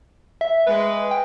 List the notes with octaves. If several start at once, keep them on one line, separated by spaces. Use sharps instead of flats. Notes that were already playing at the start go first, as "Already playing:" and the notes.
E5
G#3 B4
G5